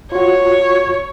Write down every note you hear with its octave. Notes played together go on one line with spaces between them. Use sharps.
F4 F#4 C#5